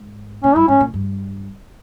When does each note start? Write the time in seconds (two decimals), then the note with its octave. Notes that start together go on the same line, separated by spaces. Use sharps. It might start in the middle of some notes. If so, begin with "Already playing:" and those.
Already playing: G#2
0.44 A#2 C#4
0.56 G2 E4
0.68 G#2 C#4
0.80 A#2
0.94 G2